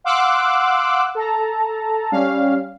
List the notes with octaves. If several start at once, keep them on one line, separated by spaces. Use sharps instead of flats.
F5 F#5 C6 D6 E6 F#6
A4 A5 A#5
G3 C#4 F5